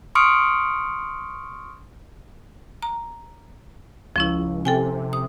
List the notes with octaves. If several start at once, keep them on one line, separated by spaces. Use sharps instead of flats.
C6 C#6 D#6 F6 C#7 D7
A#5
C#2 F3 C#4 E4
C3 A4 G5 G#5
D#6